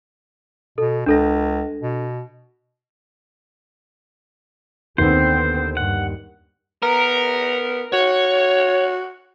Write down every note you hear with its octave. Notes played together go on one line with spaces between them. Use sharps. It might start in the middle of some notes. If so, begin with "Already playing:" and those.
B2 A4
C#2 D4 A4 A#6
B2
D#2 D3 B3 C4 C5
G2 F#5
B3 A#4
F#4 C#5